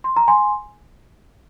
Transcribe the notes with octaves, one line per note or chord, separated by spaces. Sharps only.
C6
A#5
G#5 C6